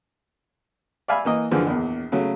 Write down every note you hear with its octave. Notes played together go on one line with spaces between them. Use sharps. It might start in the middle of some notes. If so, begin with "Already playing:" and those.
D5 E5 F5 G#5 B5
E3 A#3 D#5
F#2 D3 E3 F3 G#3
A#1 E2
C#3 F#3 A3